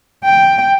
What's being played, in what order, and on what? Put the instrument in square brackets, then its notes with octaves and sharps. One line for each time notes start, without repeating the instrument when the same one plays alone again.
[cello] G5